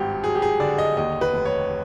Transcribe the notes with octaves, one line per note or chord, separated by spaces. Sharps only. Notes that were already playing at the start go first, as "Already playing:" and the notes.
Already playing: G#1 G2 F#4 G4
F#3 G#4
G4
G#4
D3 D5
D#5
D#2 D#5
B4
F1
C#5